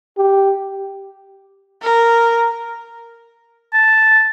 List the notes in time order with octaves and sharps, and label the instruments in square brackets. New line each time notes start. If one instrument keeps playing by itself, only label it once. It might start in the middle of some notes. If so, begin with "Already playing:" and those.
[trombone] G4
[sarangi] A#4
[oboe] A5